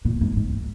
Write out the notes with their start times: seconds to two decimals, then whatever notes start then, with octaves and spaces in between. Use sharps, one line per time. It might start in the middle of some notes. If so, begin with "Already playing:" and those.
0.05 A#2
0.21 G#2
0.36 G#2